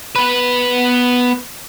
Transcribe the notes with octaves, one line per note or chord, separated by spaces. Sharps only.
B3 B4